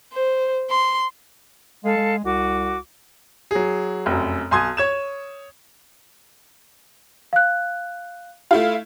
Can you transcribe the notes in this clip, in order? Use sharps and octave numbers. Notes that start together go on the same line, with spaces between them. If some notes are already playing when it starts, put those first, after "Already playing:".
C5
C6
G#3 A4 F5
G#3
C2 F#4 D6
F#3 G#4
F1 F#2
B1 G#5 C6 D#6 G#6
C#5 G#6 E7
F5 F#6
A3 E4 F4